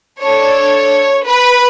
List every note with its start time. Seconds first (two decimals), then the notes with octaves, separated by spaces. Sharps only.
0.22 D4 A4 C#5
1.26 B4